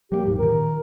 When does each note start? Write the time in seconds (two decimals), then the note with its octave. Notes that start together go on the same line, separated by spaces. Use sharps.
0.12 F#3 G#3 A#3 G4
0.26 D#1 G#2
0.39 A#2 D#3 A#4